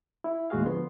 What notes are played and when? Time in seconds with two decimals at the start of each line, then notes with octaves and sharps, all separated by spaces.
0.24 E4
0.50 D#2 A2 G#3 F#4 G#4 F5
0.66 D3 F3 B3 C6